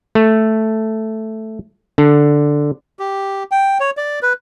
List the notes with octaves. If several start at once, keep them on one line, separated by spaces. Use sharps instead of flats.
A3
D3
G4
G5
C#5
D5
B4